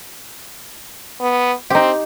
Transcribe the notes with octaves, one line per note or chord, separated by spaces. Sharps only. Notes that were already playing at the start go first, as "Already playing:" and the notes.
B3
C4 D#4 G4